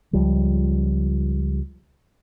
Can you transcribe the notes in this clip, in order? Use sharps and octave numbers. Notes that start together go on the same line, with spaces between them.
C#2 F3 G3